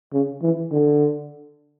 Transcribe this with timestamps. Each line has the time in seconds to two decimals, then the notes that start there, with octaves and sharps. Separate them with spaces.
0.13 C#3
0.42 E3
0.72 D3